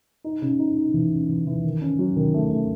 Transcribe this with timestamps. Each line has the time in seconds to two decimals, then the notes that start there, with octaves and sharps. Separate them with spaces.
0.24 D#4
0.42 C#3
0.59 D#4
0.77 D#4
0.94 E3
1.12 C#3
1.29 E3
1.47 E3
1.64 D#3
1.81 C#4
1.99 F#3
2.16 D#3
2.34 A3
2.51 A3